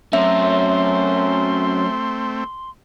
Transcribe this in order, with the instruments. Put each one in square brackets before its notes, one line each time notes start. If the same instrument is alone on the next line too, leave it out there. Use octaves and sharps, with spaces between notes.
[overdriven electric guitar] F#3 C#4 [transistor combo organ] A3 C4 [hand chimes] E5 [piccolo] C6